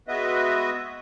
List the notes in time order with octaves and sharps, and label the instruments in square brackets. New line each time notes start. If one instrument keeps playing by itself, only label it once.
[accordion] G#3 B3 F#4 B4 D#5 E5